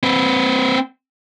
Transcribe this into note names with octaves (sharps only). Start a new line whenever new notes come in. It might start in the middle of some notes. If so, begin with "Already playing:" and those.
C4 B4